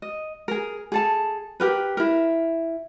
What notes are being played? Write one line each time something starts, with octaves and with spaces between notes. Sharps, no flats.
D#5
G#4 A#4
G#4 A4 A5
G4 A#4 B4
E4 A#4